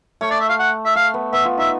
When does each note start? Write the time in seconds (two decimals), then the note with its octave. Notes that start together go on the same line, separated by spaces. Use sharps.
0.21 A3 C#5
0.31 D5
0.40 E5
0.49 F5
0.59 F#5
0.86 E5
0.95 A3 F5
1.14 B3
1.33 B3 E5
1.45 F4
1.58 D#4 E5